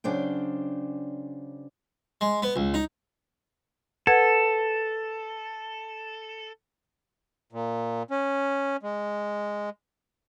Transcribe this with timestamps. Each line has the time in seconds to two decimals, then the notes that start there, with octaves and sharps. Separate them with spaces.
0.04 C#3 F#3 D4 C5 G5
2.21 G#3
2.42 B3
2.56 C#2
2.74 D#4
4.07 A4 B4 F#5 G#6
7.53 A#2
8.11 C#4
8.83 G#3